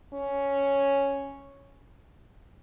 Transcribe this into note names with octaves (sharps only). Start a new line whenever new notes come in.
C#4